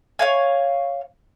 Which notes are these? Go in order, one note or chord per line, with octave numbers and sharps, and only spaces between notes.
C#5 F5 G#5